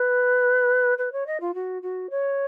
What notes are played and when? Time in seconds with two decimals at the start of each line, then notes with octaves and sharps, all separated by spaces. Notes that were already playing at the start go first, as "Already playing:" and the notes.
Already playing: B4
0.98 B4
1.12 C#5
1.26 D#5
1.40 F4
1.54 F#4
1.82 F#4
2.10 C#5